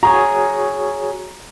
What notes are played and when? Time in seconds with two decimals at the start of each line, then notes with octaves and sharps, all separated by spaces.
0.03 F#4 G#4 C#5 A#5